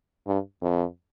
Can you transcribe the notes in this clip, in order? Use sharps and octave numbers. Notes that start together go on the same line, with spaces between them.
G2
F2